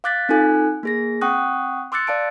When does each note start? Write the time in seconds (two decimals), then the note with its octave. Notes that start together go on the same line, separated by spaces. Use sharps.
0.04 F5 D6 F#6 A6 B6
0.29 C4 D#4 F4 A4 G#5 F#6
0.83 A#3 G#4 A#6
1.21 C4 F#5 G5 C#6 D#6 F#6
1.92 C6 D6 E6 F#6 A6 C#7
2.07 D5 F5 A5 D7